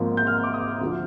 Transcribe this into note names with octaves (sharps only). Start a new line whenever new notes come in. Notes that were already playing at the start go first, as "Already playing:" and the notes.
Already playing: G#1 G#2 F3 A#3
G6
F6
D6
D#6
D2 D3 F3